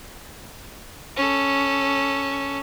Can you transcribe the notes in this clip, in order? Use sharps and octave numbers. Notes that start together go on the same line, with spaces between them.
C#4 A4